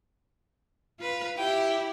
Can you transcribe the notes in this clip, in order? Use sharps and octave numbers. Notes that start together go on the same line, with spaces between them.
F4 B4
E4 G4 G5